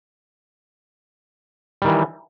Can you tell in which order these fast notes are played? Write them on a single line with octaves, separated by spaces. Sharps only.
G3 D#3 E3